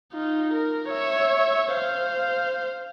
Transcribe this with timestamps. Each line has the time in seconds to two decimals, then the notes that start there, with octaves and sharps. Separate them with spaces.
0.13 D#4 F4
0.53 A#4
0.89 C#5 E5
1.72 C5 F5